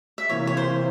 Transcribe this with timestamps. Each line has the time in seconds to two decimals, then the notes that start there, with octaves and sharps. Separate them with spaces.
0.18 E5
0.29 C3 E3 A#3 F4 C#5
0.47 C#5
0.57 C5